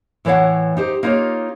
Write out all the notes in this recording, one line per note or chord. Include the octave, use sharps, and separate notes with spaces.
A2 E3 C#5 D5 F5 F#5
D#4 G4 C5
A#3 D#4 F4 G4 C#5